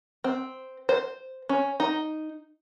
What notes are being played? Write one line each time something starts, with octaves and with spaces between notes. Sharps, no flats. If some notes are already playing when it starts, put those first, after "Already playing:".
C4
C5
C#4
D#4